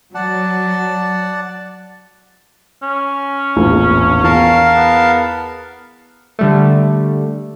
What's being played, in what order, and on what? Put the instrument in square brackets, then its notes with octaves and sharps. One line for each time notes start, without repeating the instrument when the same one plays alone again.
[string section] F#3 [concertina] D5 F#5 A5
[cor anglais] C#4
[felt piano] E1 A#1 A2
[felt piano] E2 [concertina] A#4 F5 A5
[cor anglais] B3
[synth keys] D3 G3 A3